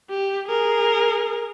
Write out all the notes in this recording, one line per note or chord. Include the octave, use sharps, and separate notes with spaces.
G4
G#4 A#4